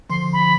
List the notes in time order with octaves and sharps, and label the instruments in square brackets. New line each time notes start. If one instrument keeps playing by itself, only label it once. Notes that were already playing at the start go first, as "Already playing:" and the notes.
[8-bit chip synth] D3 F3 [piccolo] C6
[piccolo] B5